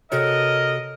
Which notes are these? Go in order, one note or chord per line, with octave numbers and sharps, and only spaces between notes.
C3 F#4 A4 A#4 C#5 D#5